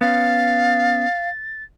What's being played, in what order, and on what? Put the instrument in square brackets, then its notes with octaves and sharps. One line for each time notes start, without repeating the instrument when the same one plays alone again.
[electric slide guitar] B3 C#4 [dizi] F5 [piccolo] A6